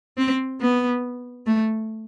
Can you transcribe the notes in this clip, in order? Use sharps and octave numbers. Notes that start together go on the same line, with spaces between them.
C4
B3
A3